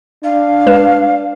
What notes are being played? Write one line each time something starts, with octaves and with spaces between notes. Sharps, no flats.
D4 F5
G#3 B4 E7